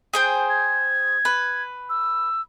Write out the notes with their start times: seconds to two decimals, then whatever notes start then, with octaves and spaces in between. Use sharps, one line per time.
0.13 G#4 C5 G5
0.50 G#6
1.25 B4
1.89 E6